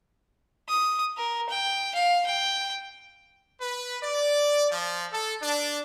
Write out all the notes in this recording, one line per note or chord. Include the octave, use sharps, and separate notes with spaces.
D#6
A#4
G5
F5
G5
B4
D5
F3
A4
D4